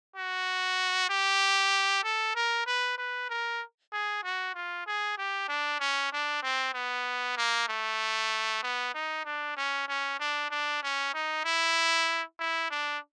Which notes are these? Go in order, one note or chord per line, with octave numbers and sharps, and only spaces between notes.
F#4
G4
A4
A#4
B4
B4
A#4
G#4
F#4
F4
G#4
G4
D4
C#4
D4
C4
B3
A#3
A3
B3
D#4
D4
C#4
C#4
D4
D4
C#4
D#4
E4
E4
D4